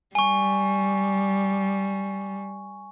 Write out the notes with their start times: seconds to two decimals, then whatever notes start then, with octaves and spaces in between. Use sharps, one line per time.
0.15 G3 G#5 C#6